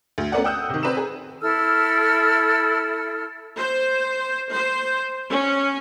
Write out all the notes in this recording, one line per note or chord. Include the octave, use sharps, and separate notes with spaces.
D2
A3 B3 C#4 A#4 D5 F#5
F#5 G5 D#6 E6 F#6 G6
C3 D#3
C4 B4 D5 A#5 E7
G#4
E4 A4 E6 F6
C5
C5
C#4